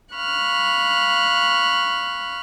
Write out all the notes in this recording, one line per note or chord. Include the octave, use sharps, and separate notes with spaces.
F5 B5 C#6 F6 F#6